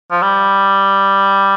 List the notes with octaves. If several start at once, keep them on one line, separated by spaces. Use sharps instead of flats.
F3
G3